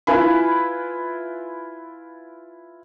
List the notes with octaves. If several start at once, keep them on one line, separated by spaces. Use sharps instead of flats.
E4 F4 B4 G#5 B5